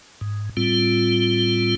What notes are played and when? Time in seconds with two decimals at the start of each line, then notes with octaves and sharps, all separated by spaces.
0.21 G#2
0.57 A2 G3 C4 F4